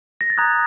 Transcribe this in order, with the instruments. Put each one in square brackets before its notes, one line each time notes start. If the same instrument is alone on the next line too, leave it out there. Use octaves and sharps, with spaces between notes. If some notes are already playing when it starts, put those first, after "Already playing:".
[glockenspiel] A#6
A6
A#5 D#6 F#6 G#6